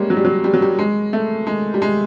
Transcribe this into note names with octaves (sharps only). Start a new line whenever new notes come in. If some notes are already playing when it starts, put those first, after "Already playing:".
Already playing: G3 G#3 A#3 C#4
F#3
G3
F#3
G3
F#3
G3
G#3
A3
G#3
G3
G#3